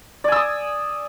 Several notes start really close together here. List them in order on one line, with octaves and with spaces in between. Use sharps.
D5 G#5 E6 D#6